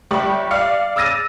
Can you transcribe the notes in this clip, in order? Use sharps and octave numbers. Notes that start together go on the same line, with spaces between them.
G1 G3 G4 C#6 F#7
D5 F5 F6 C#7
D6 E6 F6 A6 A#6 D#7